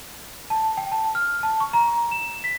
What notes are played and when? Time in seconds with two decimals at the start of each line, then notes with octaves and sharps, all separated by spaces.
0.50 A5
0.77 G5
0.92 A5
1.15 F6
1.43 A5
1.60 C#6
1.73 A#5
2.11 E7
2.44 B6